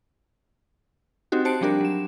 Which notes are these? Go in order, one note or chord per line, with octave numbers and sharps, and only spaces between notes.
C4 D#4 F#4 G4
C5 A5 C#7 D7
F3 G3 D4 G4 A#4
F#3 E7